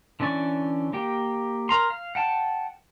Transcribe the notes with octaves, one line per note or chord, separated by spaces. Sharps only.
D3 E3 C#4 D5 C#6
A#3 G4 G5
A#4 A#5 C6
F5
F#5 G5 A5